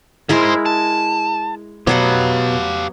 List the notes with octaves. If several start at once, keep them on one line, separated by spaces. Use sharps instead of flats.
G#2 G#3 E4 A#4 C5
A5
B2 F#3 B3 G4 F5 F#5